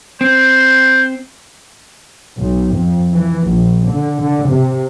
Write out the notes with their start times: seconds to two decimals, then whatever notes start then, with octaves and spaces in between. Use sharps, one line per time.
0.21 C4 C5
2.38 B1
2.74 F2
3.14 E3
3.48 A#1
3.88 D3
4.21 D3
4.50 C3